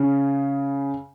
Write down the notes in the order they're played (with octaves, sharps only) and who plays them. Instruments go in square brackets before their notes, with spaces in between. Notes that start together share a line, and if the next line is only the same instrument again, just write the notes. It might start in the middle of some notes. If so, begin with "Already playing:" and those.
Already playing: [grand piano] C#3